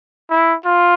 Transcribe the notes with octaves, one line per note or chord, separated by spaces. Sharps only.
E4
F4